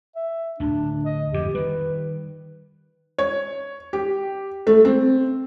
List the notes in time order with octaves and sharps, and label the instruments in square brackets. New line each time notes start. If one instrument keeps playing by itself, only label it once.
[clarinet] E5
[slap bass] D1 D2 [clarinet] D4
[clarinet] D#5
[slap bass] F2 G#2 D3 [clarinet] G4
[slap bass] D#3 G3 [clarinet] B4
[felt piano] C#5
G4
A3
C4